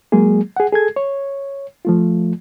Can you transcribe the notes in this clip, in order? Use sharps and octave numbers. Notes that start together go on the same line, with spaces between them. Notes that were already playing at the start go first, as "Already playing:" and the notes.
F#3 G#3 A#3 G#4
G#4 F#5
G#4 A4 G#6
C#5
F3 A3 F4